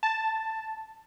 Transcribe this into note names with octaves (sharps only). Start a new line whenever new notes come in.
A5